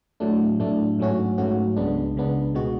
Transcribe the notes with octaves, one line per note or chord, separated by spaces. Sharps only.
A2 F#3 A3 D4
A2 F#3 A3 D4
G#2 F#3 A3 C#4 F#4
G#2 F#3 A3 C#4 F#4
C#2 C#3 G#3 B3 D4
C#2 C#3 G#3 B3 D4
B2 G#3 B3 F#4